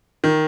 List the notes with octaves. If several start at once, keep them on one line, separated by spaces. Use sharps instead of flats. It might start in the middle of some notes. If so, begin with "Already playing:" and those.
D#3